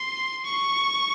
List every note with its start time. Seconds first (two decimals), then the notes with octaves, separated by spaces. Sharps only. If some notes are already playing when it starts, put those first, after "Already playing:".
Already playing: C6
0.46 C#6